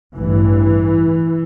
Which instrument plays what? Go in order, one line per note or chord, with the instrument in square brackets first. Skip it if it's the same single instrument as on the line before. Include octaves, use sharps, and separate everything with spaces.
[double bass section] A1 G2 E3